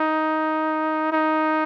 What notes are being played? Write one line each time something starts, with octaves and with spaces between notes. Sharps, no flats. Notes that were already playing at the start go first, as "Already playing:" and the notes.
Already playing: D#4
D#4